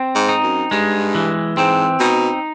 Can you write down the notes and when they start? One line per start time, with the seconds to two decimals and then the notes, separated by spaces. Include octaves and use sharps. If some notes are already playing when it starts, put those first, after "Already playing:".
Already playing: C4
0.15 G#2
0.29 D#4
0.43 F#2
0.71 G2 G#3
1.15 E3
1.57 G#2 C4
2.00 B2 D#4